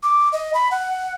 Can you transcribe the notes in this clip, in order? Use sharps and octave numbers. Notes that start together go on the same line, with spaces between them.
D6
D#5
B5
F#5